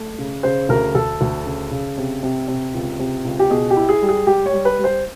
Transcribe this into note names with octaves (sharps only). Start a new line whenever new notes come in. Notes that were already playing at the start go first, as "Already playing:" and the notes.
Already playing: A3
C#3
C#3 C5
D2 A#4
D2 A4
D2
C#3
C#3
C3
C3
C3
C#2
C3
C#2
G4
B2 G#4
G4
E4
G#4
G3
G#4
G3 G4
C#5
G3
B4
G3
C5